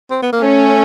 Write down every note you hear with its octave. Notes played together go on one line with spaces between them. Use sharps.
C4
B3
A#3
A3 C#4